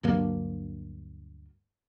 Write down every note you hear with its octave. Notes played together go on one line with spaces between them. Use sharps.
D2 G2 F#3 A#3